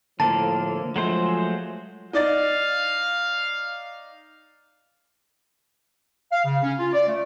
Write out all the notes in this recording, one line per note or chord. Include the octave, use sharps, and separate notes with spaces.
A2 D3 F3 A#3 A5
F3 F#3 G#3 A3 C5
D#4 D5 F5 A6
F5
C#3
C#4
F4
D5
A3